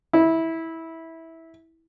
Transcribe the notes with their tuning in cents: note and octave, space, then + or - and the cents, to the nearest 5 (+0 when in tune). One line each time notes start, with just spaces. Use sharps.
E4 -15